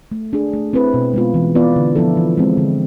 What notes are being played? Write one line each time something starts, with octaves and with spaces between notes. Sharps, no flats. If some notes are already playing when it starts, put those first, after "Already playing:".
A3
D4 G#4
A3
C4 E4 B4
B2
G#3 B3 F4
E3
B3 F4 B4 D5
D3
F3 B3 E4 A4
E3
G#3 C4
D3